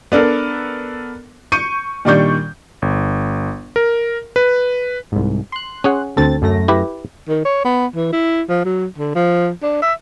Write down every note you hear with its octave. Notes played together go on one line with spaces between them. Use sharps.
B3 D4 A4 A#4
C#6 G6 C#7 D#7
A#2 D#3 G3 D4 C#6 G6
G1
A#4
B4
C2 G#2
C6 F#6
C#4 G#4 F#5
D2 C4 A4 A6
F#2 A3 A#6
E4 G4 B4
D#3
C#5
B3
E3
E4
F3
F#3
D3
F3
D4
E5